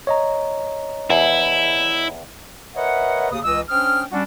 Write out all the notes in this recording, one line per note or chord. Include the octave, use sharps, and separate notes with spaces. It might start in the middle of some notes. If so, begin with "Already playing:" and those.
C#5 D#5 A#5
E2 E4
A#4 B4 C#5 D#5 E5 F#5
D#2 C#3 D#6
C#2 E3 D#5 E6
C#4 D4 C5 G5 D#6 F6
G3 C#4 D4 F#4